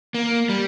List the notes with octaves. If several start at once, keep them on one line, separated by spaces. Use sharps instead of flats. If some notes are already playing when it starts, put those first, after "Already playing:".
A#3
G3